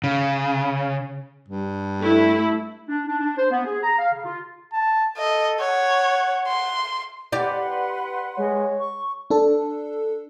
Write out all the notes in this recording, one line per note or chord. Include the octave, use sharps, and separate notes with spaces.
C#3
G2
A3 E4
D4
D4
D4
C5
B3
G#4
A#5
F5
C#3
F4
A5
A4 D#5
C#5 F#5
C6
G4 B4 D5 F#5 C6
G#3 C#5
C#6
D4 A4